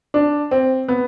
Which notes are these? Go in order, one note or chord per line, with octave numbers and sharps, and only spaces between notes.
D4
C4
B3